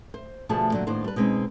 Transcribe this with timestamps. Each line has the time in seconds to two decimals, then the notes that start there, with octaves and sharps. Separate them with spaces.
0.14 C5
0.49 D2 B2 F3 A3 G#4 A5
0.72 A#2 D3 F#3
0.87 D#2 A2 B3 D4 C5
1.04 G3 B4
1.16 B2 G3 G#3 C4 C#4 D#4